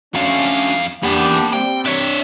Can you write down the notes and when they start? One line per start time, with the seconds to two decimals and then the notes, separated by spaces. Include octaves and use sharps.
0.15 F2 C#4 D4 F#4 F5
1.03 E2 A#3 D4 G4 F#5
1.53 G3 C4 G5
1.85 D4 C#5 E5